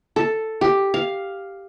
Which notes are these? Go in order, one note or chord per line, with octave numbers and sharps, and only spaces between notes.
A4
G4
F5